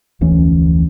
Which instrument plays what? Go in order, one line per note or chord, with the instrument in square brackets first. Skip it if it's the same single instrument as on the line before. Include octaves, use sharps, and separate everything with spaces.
[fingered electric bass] F1 D2 E3 C#4